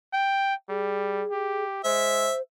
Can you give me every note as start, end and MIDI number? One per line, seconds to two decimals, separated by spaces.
0.13 0.54 79
0.69 1.24 55
0.69 1.64 68
1.31 1.81 67
1.84 2.30 56
1.84 2.41 72
1.84 2.34 76